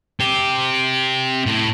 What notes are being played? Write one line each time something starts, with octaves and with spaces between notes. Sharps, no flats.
C4 G4
A2